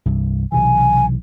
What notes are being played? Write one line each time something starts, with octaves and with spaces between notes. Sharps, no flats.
C2 G2
B1 C3 E3 G#5